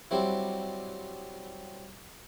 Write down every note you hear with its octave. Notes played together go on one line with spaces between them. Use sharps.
F#3 G3 C4 E4